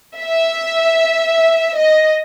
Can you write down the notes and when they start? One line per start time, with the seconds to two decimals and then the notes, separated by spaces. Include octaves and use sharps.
0.18 E5
1.76 D#5